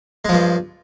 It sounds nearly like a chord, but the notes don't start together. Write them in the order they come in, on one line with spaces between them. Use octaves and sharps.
G#3 F3 G2